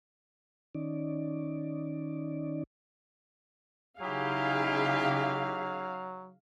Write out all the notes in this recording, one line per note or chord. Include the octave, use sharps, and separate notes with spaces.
D#3 C#4 D#4 D5
C#3 F#3 D#4 E4 G4 G#4 F5